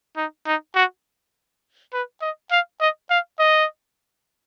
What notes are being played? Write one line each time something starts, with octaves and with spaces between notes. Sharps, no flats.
D#4
D#4
F#4
B4
D#5
F5
D#5
F5
D#5